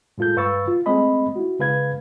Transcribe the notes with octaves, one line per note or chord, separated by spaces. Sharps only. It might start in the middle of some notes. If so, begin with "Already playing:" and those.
A2 G#3 F4 A4 G6
G2 B4 F5 C#6 E6 A6
F4
G#3 A3 C4 D#5 B5
E4 F#4
C#3 G#3 B4 F5 G#6